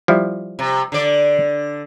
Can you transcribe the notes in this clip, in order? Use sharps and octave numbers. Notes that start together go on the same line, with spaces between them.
F3 G3 E4
C3
D3 D5